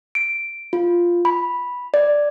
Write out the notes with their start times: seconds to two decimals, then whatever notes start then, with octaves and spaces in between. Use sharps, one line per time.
0.15 D7
0.73 F4
1.25 B5
1.94 D5